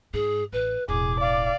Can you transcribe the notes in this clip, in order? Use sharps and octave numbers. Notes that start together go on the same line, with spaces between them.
G#2 G#4
A1 B4
E1 A1 G#4 D6
D5 F5